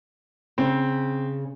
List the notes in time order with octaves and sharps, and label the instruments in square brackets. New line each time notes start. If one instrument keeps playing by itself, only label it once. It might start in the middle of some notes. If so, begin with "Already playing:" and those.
[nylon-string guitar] C#3 [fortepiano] C4